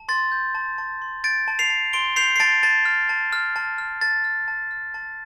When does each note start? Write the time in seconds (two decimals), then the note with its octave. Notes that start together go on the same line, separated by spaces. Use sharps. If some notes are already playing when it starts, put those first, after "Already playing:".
Already playing: A5
0.09 C6 A6
0.32 G6
0.55 A5
0.78 A5
1.02 C6
1.24 G6 A6 D7
1.48 A5
1.59 C7 F7
1.70 A5
1.93 C6 D7 G7
2.16 G6 C7 F7
2.36 C7
2.39 A5 A6 D7
2.63 A5 A6
2.85 F6
3.09 A5
3.33 F6
3.56 A5
3.78 F6
4.01 A5 A6
4.24 F6
4.48 A5
4.71 F6
4.94 A5